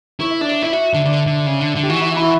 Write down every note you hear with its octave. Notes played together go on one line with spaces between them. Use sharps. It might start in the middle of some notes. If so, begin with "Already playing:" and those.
E4 C#5
E5
D4 D5
D5
E4 E5
F#4
D3
D3 D5
D3
C#3
D3
D3
G4
E3 F#4
E4
F#4
E4
F#4